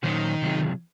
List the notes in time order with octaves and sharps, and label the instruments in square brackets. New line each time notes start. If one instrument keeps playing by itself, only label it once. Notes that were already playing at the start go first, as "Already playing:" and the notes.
[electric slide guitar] A#2 F#3 C#4 F#4 C5 [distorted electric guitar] D#3
[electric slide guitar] C3 F#3 C4 F4 G#4